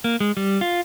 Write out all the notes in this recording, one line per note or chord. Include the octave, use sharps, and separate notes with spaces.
A#3
G#3
G3
F4